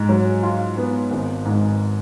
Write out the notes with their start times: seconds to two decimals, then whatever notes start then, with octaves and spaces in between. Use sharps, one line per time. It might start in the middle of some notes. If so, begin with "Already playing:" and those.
Already playing: G#2
0.09 F#3
0.43 F4
0.77 B3
1.11 G#1
1.45 G#2